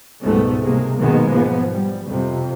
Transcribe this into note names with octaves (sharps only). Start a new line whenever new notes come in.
C#2 G#2 B2 G3 A3 B3
C3 G#3 A#3
B1 G#2 D#3 G#3 A#3 B3
G#2 F3 B3
G3
F2 C3